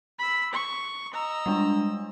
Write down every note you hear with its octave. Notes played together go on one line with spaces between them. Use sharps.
B5 E6
C#6
D#5 A#5 E6
G3 G#3 D4